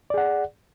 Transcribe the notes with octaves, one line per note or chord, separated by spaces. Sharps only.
G#4 D5 F#5